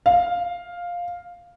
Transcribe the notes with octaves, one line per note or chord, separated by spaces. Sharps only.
F5